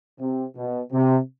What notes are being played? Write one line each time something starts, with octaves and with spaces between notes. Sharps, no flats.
C3
B2
C3